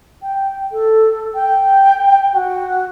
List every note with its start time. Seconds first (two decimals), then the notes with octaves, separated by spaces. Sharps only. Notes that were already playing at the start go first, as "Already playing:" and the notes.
0.22 G5
0.72 A4
1.34 G5
2.33 F#4